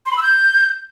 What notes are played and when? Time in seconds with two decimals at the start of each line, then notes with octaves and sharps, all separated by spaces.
0.06 C6
0.11 B5
0.17 E6
0.23 G6